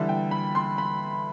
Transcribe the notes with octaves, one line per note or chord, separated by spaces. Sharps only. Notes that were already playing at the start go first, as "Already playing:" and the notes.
Already playing: E2 D3 G3 E5
G5
B5
C6
B5